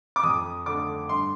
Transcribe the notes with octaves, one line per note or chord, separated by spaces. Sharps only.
D6
F2 D#6
D3 A3 D6
G2 C6